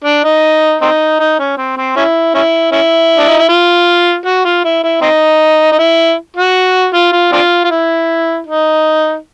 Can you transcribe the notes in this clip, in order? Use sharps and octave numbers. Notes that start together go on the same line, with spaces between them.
D4
D#4
C4 D#4
D#4
C#4
C4
C4
C#4 E4
C#4 E4
C#4 E4
D4
D#4
E4
F4
F#4
F4
E4
E4
C4 D#4
D#4
E4
F#4
F4
F4
C4 D4 F4
F4
E4
D#4